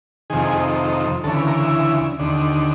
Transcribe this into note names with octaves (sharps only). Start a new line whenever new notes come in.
F2 C3 D#3 G#4
D2 C#3 E3 A4
B4
A#4
E4
D#2 D3